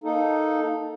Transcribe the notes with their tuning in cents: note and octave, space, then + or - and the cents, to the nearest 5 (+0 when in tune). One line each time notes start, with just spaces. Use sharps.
A#3 +0 D#4 +0 A4 +0